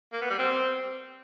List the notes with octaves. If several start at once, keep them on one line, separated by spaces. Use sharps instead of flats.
A#3
B3
G3
C4